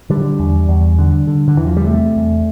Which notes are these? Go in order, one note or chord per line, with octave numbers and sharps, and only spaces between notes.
D3 G3
E2
E2
D3
D3
D3
E2 E3
F3
G3
C3 A3
E2